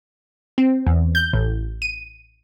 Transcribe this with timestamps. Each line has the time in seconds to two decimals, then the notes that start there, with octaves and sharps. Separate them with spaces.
0.58 C4
0.87 E2
1.15 G6
1.33 A1
1.82 D#7